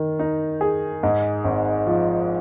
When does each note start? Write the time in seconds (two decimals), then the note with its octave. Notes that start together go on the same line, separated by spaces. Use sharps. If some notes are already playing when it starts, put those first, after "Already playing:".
Already playing: D#3
0.19 D#4
0.61 G#4
1.03 G#2
1.44 G#1
1.87 F3